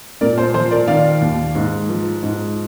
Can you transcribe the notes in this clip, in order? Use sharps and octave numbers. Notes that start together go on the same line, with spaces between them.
A#2 A#4 D5
C5
F3 C5
A#4 D5
D#3 D5 F5
D#2
G#2
F3
G#2